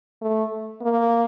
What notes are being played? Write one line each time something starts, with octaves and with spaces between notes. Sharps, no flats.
A3
A#3